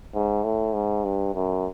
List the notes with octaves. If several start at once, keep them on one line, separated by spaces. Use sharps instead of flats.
G#2
A2
G#2
G2
F#2